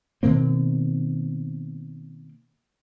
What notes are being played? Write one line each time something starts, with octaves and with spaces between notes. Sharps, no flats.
B2 D#3 A#3 C4